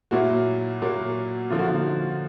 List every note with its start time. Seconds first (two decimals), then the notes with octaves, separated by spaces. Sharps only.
0.11 A#2 F#3 A#3 E4 F#4
0.82 A#2 F#3 A#3
1.50 D3 F3 A#3 F4
1.59 F#4
1.68 D#4 F4